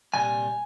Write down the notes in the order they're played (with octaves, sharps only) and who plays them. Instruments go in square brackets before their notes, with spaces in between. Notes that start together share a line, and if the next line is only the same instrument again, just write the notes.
[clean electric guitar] C2 A#2 G3 G#5